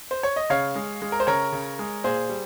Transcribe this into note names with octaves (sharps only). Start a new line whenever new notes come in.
C5
C#5
D#5
C#3 C#5 F5
G#3
G#3
A#4
C5
C#3 A#4 C#5
C#3
G#3
A#2 G#4 C5
G3